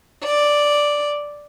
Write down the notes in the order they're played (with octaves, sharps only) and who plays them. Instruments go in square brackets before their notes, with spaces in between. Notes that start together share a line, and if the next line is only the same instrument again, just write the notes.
[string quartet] D5